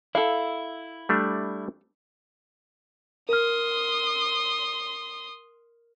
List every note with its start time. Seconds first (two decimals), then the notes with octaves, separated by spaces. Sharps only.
0.15 E4 A4 F5
1.09 G3 A3 D4
3.29 A#4 C6 D#6 F6